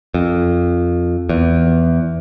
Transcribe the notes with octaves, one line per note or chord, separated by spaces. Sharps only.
F2
E2